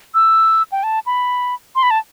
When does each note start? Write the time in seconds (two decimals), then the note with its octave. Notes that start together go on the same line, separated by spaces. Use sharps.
0.14 E6
0.72 G5
0.83 A5
1.06 B5
1.76 C6
1.83 B5
1.91 A5